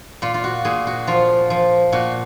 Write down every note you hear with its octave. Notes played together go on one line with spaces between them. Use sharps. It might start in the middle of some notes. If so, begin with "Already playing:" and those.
A#2 F4
F4
F#4
A#2 G#4
F#4
F3 F4
F3
A#2 F#4